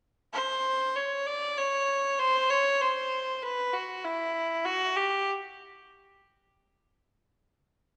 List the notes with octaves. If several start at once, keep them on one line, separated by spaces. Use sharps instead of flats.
C5
C#5
D5
C#5
C5
C#5
C5
B4
F#4
E4
F#4
G4